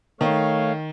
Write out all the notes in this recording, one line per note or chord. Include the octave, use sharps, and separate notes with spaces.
D#3 A3 C#5 F5